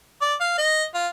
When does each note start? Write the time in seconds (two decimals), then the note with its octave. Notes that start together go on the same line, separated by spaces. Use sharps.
0.21 D5
0.41 F5
0.58 D#5
0.94 F4